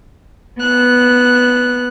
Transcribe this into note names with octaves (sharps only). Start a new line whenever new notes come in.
B3 F#6